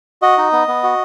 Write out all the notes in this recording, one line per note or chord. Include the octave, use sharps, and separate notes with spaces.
F#4 D#5
D#4
B3
B3
F#4